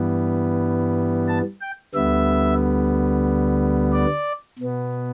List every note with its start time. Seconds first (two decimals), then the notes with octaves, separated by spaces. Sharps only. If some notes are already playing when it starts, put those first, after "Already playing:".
Already playing: G2 E3 G3 B3
1.28 A5
1.61 G5
1.94 D2 D3 G3 B3 E5
3.93 D5
4.59 B2 B3